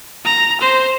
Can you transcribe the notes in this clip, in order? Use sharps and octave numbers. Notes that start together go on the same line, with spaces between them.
A#5
C5